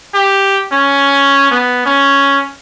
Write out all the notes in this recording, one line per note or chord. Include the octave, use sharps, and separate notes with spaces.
G4
C#4
B3
C#4